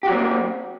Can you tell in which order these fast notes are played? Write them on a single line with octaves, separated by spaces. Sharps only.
G4 F#4 F#3 C4 A#3